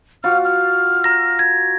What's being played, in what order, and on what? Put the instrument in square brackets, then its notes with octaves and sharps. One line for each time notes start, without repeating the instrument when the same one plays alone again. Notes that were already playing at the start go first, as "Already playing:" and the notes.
[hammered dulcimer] F4 F#4 [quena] F6
[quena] F6
[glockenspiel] A#5 A#6
G#6